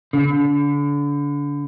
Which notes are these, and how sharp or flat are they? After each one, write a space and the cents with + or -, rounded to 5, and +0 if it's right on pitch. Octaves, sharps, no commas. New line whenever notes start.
D3 -30